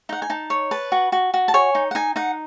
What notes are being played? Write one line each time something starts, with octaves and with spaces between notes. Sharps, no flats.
D#4 F#5
G#5
D#4 A5
C#5
B4 A5
F#4
F#4
F#4
A5
C#5 G#5
D#4
F#5
D#4 G#5
D#4 F#5